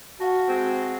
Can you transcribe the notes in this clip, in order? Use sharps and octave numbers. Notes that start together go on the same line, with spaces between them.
F#4 F5 F#5 A5
G#3 C4